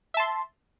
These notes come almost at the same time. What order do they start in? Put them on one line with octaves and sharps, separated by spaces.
E5 A5 C6